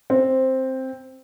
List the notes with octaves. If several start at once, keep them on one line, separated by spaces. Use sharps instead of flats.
C4